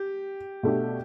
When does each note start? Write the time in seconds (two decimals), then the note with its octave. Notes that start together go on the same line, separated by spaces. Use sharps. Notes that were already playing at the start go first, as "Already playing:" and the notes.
Already playing: G4
0.63 B2 A3 D4 G4